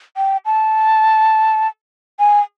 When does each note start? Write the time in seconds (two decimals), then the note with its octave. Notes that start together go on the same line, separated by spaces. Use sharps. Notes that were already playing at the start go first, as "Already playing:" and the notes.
0.17 G5
0.46 A5
2.19 G#5